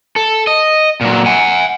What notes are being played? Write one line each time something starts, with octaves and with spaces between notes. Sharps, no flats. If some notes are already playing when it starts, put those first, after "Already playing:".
A4
D#5
A#2 F#3
F#5 G#5